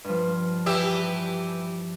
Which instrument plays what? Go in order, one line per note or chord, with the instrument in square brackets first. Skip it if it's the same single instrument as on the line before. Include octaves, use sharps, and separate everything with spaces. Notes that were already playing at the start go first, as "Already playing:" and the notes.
[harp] G2 F3
[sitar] E3 G4 E5